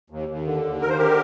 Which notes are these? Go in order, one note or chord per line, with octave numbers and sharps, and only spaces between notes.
D#2
D#2
D3
D#2
D#2 A#4
C5
D3 G4 A#4